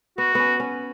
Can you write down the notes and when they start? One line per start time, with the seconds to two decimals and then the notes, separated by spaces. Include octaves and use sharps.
0.18 B3 F#4
0.35 B3 C#4
0.60 C#4